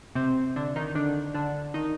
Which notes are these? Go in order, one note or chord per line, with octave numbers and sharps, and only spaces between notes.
C3 C4
D3 D4
D#3 D#4
D3 D4
D3 D4
D#3 D#4